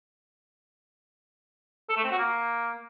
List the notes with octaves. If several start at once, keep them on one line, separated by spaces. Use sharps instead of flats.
A4
A3
C4
F#4
A#3